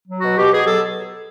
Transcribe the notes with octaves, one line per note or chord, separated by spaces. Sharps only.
F#3
F#4
B2
B2 G4
B2 G#4
F#3 A4